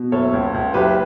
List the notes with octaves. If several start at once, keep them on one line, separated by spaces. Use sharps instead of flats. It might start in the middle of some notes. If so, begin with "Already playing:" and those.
Already playing: B2
F#1 A4 C#5
C#2
C#2
F#1 G4 B4